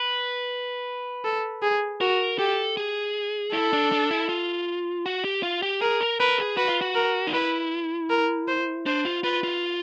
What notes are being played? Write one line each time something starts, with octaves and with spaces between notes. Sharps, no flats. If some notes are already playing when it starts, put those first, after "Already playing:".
Already playing: B4
A4
G#4
F#4 A#4
G4 A4
G#4
E4 A4
D4
D4
E4
F4
F#4
G4
F4
G4
G#4 A#4
A#4
A#4 B4
G#4
F#4 B4
F4
F#4
A#4
D#4
E4 B4
A#4
C5
D4 C5
F4
F4 B4
F4